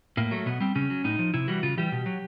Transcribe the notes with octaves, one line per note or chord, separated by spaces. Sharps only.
A2 A#3
F#3 A3
B2 B3
G3 C4
C#3 C#4
F#3
A2 D#4
F3
C3 E4
E3 G3 F#4
C#3 F4
E3 G3 G4
B2
F#3